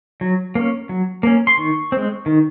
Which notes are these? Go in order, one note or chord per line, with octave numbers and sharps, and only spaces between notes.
F#3
A#3 C#4
F#3
A#3 C#4
C6
D#3 C#6
G#3 C4
D#3